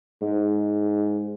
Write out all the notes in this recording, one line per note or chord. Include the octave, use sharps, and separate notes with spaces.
G#2